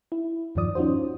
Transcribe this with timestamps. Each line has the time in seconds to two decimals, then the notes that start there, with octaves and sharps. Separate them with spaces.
0.12 E4
0.55 E2 G2 D#3 F3 D5 D#6
0.75 C#4 D#4 F4 F#4 C5